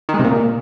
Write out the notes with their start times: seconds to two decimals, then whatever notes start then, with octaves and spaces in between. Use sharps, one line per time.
0.09 D#3
0.14 G#3
0.19 C3
0.24 A#2